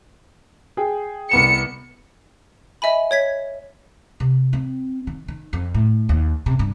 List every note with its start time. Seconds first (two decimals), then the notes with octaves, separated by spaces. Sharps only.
0.77 G#4 G5
1.31 C2 B3 C#7 E7
2.82 D#5 E5 G#5 B5
3.11 C#5 G#6 B6
4.20 C3
4.53 C4
5.07 D#3
5.28 D#3
5.53 F2
5.74 A2
6.09 D#2
6.46 C3
6.59 G2